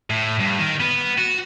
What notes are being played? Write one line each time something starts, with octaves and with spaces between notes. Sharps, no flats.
A2
G2
D#3
B3
F#4